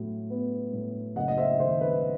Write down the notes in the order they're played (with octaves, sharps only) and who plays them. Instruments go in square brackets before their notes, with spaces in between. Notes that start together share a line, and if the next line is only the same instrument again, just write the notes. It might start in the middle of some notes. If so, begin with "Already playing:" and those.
Already playing: [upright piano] A2 F#3
B3
A2
F#1 D#5 F#5
D#5
C5 E5
D#3 C5
B4